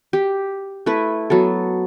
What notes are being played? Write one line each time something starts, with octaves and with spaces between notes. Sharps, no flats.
G4
A3 E4 B4
F#3 B3 A4